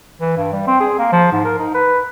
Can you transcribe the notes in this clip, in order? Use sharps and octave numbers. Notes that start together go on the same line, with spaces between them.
E3
G2
G3
C4
G#4
A#3
F3
G#2
A#4
D#4
B4